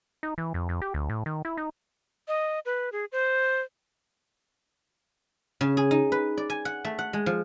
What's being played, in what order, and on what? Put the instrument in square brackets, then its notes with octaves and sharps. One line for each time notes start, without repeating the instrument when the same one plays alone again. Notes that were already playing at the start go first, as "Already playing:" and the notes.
[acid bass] D#4
E3
F2
F2
G4
D2
A2
D#3
E4
D#4
[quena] D#5
B4
G#4
C5
[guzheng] C#3
G#4
D#4
B4
D5
G#5
F#5
A3
F#5
G#3
F3